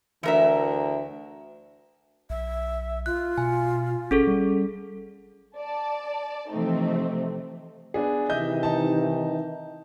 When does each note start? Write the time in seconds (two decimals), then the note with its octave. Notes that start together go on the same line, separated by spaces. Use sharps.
0.23 D2 E3 A#4 E5
2.30 B1 E5
3.06 F4 F#6
3.38 B2 G#5
4.11 G#1 C#4 G#4 A4
4.27 G3
5.58 D5 A5
6.51 C3 E3 F3 A3 C4 D#4
7.94 B3 D4 G#4
8.29 C3 D#3 E3 D#5 E5 G6
8.63 D#4 A5